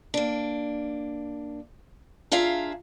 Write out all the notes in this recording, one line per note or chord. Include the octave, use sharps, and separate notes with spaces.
A#3 D4
D4 F4 G#4 E5 F5 A#5